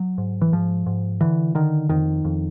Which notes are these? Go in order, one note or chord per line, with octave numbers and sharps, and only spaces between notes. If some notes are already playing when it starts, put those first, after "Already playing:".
Already playing: F#3
G#2
E3
G#2 F3
G#2
D3 E3
D3 D#3
F2 D#3
F2